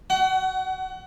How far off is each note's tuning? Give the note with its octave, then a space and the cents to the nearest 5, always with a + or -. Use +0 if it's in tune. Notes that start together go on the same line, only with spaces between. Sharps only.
F#4 +15 F#5 +35